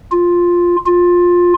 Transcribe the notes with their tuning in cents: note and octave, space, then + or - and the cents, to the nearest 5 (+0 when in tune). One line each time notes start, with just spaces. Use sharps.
F4 +5
F4 +15